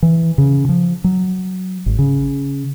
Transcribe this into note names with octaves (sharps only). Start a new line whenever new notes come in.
E3
C#3
F3
F#3
G#1
C#3